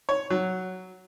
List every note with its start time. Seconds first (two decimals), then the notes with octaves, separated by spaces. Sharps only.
0.09 C#5
0.30 F#3